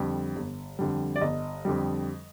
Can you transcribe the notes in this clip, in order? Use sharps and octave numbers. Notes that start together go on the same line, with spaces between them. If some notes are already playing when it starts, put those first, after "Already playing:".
Already playing: F2 D3 G3
G1
F2 D3 G3
D5
G1 D#5
F2 D3 G3